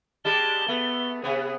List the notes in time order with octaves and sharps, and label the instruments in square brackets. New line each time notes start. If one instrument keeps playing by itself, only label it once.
[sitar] G3 G#3 G4 [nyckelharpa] A5 [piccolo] G7
[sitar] A3 [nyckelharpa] B3
[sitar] C3 B3 [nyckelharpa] G#4